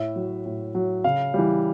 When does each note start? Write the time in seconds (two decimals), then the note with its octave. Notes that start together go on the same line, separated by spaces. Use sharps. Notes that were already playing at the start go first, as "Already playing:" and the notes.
Already playing: A2 E5
0.16 F#3
0.46 A2
0.75 F#3
1.04 C#3 F5
1.34 E3 G3